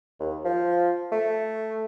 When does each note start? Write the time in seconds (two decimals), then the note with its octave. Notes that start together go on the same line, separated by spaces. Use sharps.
0.20 D#2
0.45 F3
1.12 A3